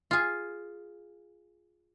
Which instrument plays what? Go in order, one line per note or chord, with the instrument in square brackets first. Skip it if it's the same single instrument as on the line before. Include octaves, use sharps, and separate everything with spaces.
[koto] F4 G#4